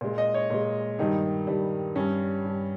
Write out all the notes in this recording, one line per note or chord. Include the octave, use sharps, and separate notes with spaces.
A#2 G#3
D#5
C#5
A#2 G#3
G2 D#3 G3 D#4
G2 D#3 G3
G2 G3 C#4
G2 G3